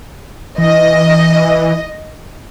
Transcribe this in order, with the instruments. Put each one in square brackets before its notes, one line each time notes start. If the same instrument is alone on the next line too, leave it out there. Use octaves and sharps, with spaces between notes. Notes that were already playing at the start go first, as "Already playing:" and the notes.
[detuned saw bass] E3 [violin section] D#5